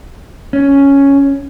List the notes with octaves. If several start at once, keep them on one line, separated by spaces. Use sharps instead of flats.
C#4